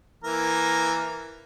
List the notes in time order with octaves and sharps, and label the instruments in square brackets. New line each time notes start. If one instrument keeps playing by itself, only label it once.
[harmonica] E3 A#3 A#4